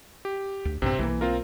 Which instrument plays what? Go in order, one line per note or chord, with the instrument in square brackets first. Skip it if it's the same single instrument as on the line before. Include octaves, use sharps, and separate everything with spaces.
[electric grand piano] G4
[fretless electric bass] D2
[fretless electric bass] A#1 G2 [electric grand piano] C3 C4
[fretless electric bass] B1 G3 A#3 [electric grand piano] E3
[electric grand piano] C4 F4 A#4